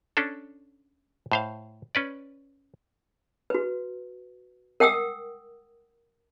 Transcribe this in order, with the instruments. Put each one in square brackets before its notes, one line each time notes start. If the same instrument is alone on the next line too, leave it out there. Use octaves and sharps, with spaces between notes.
[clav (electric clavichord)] C#4 D4 A4
A2 C5 F5
C#4 B4 D5
[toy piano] F#4 B4
A#4 F#5 G5 D#6 E6